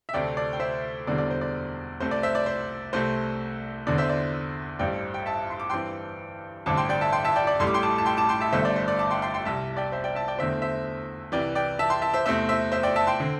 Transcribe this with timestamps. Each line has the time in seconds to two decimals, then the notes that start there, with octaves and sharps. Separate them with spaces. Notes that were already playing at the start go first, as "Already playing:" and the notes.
0.09 E5
0.14 D2 C3 A3 C4 D5 G5
0.37 D5
0.53 G5
0.60 C5 E5
1.06 E1 E2 D3 G3 C4 D5
1.18 D5
1.30 C5
1.41 D5
2.00 C2 C3 A3 C4 C5
2.11 D5
2.23 C5 E5
2.35 D5
2.46 C5
2.93 C2 C3 A3 C4 C5
3.87 E2 D3 C4 D5
3.98 C5 E5
4.09 D5
4.79 A1 G2 G3 C4 D5 G5
5.14 G5
5.26 E5 A5
5.50 C6
5.60 D6
5.70 G2 E3 C4 G5 C6
6.66 A1 G2 D3 C4 A5 D6
6.77 G5 C6
6.89 D5 G5
7.01 E5 A5
7.13 G5 C6
7.25 E5 A5
7.36 D5 G5
7.47 D5
7.60 A1 A2 G3 C6
7.67 D6
7.74 G5 C6
7.83 A5 D6
7.98 A5
8.06 G5 C6
8.17 A5 D6
8.29 G5 C6
8.40 E5 A5
8.53 G1 G2 D3 A3 C5 E5
8.65 D5
8.76 C5
8.88 D5
8.99 A5 D6
9.10 G5 C6
9.22 G5 C6
9.34 G5 C6
9.45 C2 C3 G3 E5 A5
9.77 D5 G5
9.92 C5 E5
10.04 D5 G5
10.15 E5 A5
10.28 D5 G5
10.39 E2 D3 A3 C4 C5 E5
10.62 C5 E5
11.32 C2 C3 E3 D5 G5
11.55 D5 G5
11.79 E5 A5
11.90 G5 C6
12.02 E5 A5
12.14 C5 E5
12.26 E2 C3 A3 C4 C5 E5
12.49 C5 E5
12.72 C5 E5
12.83 D5 G5
12.96 E5 A5
13.07 G5 C6
13.20 D3 C4